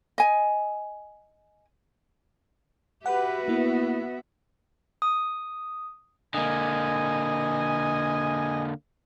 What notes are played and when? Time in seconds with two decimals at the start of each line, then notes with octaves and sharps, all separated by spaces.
0.18 D#5 G#5
3.06 F#4 G4 B4 E5 F#5
3.48 A#3 B3 E4
5.02 D#6
6.34 D3 A#3 D#5 G#5